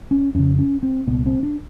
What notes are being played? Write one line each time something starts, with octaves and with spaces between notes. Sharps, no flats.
C#4
F2 C#3 C#4
C#4
C4
C2 A#2 B3
C4
D4